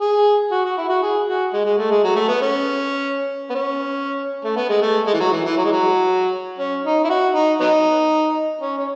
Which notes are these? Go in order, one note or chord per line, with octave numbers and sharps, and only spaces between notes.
G#4
F#4
F#4
E4
F#4
G#4
F#4
G#3
G#3
A3
G#3
F#3
A3
B3
C#4
B3
C#4
A3
B3
G#3
A3
G#3
E3
F#3
E3
E3
F#3
G#3
F#3
C#4
D#4
E4
F#4
D#4
F#3 B3 D#4
C#4
C#4